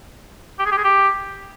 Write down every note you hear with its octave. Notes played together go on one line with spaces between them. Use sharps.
G4
G#4
G4
G#4
G4